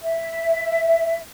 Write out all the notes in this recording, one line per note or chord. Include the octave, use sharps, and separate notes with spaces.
E5